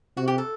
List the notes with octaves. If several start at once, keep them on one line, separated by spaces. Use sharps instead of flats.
C3 F#4
G4
A4